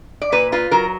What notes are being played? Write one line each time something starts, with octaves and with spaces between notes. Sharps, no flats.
D5
A#2 B4
F4 B4
F#3 A#4